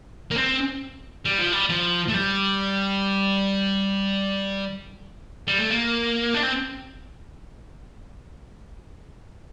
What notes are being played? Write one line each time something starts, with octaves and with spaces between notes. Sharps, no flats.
A#3
C4
G3
F3
G3
F3
A3
G3
G3
A3
A#3
D4
C4